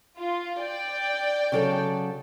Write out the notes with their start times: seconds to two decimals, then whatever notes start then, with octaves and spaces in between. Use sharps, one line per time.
0.18 F4
0.62 D5 G5
1.52 C#3 F#3 A4